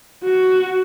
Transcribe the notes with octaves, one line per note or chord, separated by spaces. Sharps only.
F#4